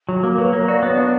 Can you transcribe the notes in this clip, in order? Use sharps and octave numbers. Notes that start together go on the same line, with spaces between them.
F#3
A#3 F#4
A#4
F#3 B4
A#3 C#5
F#4 D5
B3 C#5
D4